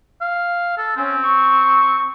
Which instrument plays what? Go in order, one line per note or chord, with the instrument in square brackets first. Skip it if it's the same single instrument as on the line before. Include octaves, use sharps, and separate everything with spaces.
[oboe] F5
A4
[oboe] C4 [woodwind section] C#4
[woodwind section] C#6